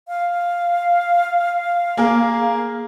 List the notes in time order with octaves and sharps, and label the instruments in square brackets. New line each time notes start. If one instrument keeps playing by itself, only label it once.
[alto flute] F5
[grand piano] A#3 G#4 A#4